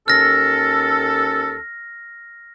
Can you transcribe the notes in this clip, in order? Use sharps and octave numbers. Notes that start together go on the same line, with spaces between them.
D#2 C#4 A4 F6 A#6